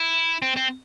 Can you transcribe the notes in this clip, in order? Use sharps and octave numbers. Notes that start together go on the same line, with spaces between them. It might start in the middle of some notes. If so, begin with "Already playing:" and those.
Already playing: E4
C4
C4